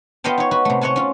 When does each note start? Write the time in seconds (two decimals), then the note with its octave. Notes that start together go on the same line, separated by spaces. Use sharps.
0.24 B3 F4 D#5 F5 G5 A5
0.38 D#4 C#5
0.51 F#4 B4
0.65 C3 A3
0.81 C#5 D#5 F#5 G#5 A5
0.96 C#4 F4